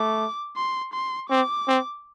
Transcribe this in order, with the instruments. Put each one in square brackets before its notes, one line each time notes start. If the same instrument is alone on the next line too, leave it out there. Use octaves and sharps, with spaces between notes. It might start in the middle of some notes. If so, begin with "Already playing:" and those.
Already playing: [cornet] A3 [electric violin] D6
[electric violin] C6
C6
[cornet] C4 [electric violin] D6
[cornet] C4